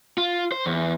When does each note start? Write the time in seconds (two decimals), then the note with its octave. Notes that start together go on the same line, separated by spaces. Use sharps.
0.18 F4
0.52 C5
0.66 E2